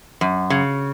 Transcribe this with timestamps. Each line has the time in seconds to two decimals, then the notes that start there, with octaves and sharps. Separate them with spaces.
0.21 F#2
0.50 C#3